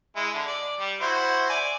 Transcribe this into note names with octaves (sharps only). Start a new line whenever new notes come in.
G#3 E4
D3
D5
G3
E4 F#4 C5
D5 G#5